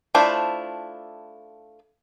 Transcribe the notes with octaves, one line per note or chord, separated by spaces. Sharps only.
A3 D4 E4 F4 C5